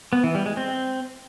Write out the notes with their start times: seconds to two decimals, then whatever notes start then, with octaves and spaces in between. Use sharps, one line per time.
0.13 B3
0.24 E3
0.35 G3
0.46 G#3
0.57 C4